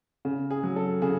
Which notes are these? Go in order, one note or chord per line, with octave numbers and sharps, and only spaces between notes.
C#3
G#4
F#3
A4
C#3 G#4